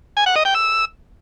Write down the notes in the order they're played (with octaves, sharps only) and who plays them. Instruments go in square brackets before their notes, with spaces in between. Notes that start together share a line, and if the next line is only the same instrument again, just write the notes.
[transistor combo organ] G#5
F#5
D#5
G5
E6